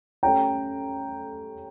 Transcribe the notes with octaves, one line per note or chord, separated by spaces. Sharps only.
A3 C#4 G4 C#5 G5 A#5